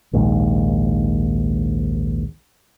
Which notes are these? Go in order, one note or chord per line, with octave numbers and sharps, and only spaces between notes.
A#1 D#2 G#2